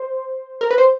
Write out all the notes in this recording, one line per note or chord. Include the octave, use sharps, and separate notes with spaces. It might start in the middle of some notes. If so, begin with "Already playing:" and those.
Already playing: C5
A#4
B4
C5